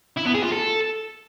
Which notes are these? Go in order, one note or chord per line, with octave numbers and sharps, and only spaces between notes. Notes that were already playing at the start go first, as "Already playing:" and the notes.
E4
B3
G#4
F4
A4